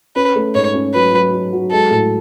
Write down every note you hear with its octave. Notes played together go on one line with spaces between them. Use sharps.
C#4 B4
A3
G#2 C#5
C#4
F#3 B4
F#3
F#3
F#3
G#3 A4
A2